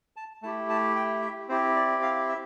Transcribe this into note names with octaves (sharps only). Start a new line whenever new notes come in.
A5
A3 E4 G4 A5
A5
G5
E5
C4 E4 G4 C5
D5
F5
E5